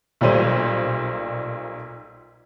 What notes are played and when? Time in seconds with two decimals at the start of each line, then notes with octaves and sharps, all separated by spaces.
0.21 B1 A#2 G3 C5 D#7